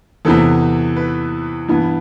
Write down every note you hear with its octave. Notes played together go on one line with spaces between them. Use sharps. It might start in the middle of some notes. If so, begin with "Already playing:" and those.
E2 C3 E3 B3 A4
B4
G2 E3 B3